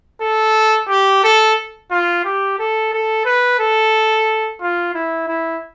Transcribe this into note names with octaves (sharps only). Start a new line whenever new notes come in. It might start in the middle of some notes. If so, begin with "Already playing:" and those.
A4
G4
A4
F4
G4
A4
A4
B4
A4
F4
E4
E4